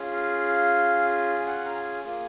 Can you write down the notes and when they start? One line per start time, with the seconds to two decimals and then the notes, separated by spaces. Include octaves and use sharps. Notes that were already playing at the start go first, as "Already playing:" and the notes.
Already playing: C#4 F4 G#4
0.12 F5
1.40 G#5
1.46 F#5
1.66 A#5
1.75 G#5
2.04 A#3 F4 G#4